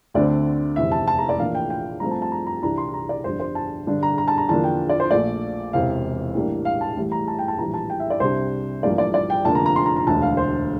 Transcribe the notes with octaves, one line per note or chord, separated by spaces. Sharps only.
D2 D3 A3 C4 D5
F1 E2 C3 E5
A5
A5
A#5
D5
A1 A2 F3 A#3 D4 F5
G5
G5
G2 F3 A3 C4 A#5
A5
A5
A#5
A#5
C2 C3 E3 G3 D4 A#5
C6
A#5
D5
G1 F2 D3 G3 C5
C5
A5
G2 D3 G3 D4
A#5
A#5
A5
A#5
E2 D3 F3 A#3 D4 A5
G5
D5
C5
A#1 A#2 A3 D5
E1 E2 C3 F5
A1 A2 G3 A#3 D4
F5
A5
A1 A2 G3
A#5
A5
G5
A5
A#1 A2 E3 G3 A#5
A5
G5
E5
D5
C2 C3 G3 D4 C5
A1 G2 F3 A#3 D5
D5
D5
G5
F1 F2 D3 F3 A#3 A5
A#5
A#5
C6
A#5
A#5
E1 D2 D3 A5
F5
C5